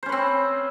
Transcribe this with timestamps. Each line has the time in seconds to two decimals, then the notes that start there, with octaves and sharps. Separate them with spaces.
0.03 C5
0.06 C#4
0.09 B4
0.12 C4